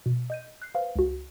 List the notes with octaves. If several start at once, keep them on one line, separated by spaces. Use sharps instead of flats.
B2
D#5 G6 D#7
F#6 G6 C7
B4 C5 F5
C#2 F#4